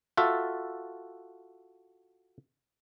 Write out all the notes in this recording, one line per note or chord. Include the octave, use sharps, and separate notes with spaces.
F4 F#4 A4 E5